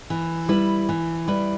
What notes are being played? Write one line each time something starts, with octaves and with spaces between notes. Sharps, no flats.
E3
G3 E4 B4
E3
G3 E4 B4